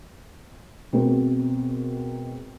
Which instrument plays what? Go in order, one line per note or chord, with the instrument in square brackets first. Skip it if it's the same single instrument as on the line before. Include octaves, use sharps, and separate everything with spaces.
[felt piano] B2 G#3 C4 F#4 A#4